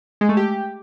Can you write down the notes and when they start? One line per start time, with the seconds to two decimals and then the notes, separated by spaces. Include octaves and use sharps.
0.21 G#3
0.29 A3
0.37 G4